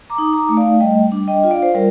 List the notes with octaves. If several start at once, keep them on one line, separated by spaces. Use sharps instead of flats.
A#5 D6
D#4
A#5 D6
A3
D5 F5
G3 D#5 G5
D4
D#5 G5
F4
D5 F5
C5
G3 A#4 D5